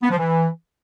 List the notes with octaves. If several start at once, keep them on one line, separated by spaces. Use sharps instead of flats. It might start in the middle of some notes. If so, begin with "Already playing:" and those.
B3
F3
E3